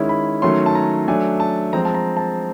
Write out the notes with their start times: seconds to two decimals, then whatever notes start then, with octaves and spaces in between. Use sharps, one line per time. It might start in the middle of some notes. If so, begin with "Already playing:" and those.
Already playing: D#3 G#3 C#4 E4
0.09 B5
0.42 D#3 F#3 A3 C#4 C6
0.66 A5
0.75 A#5
1.08 F#3 A3 D4 G#5
1.40 A5
1.73 F3 G#3 C4 A#5
1.85 A5
1.95 A#5
2.17 A5